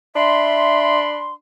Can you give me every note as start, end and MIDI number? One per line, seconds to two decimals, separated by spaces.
0.16 1.34 62
0.16 0.96 76
0.16 1.34 83
0.16 1.34 84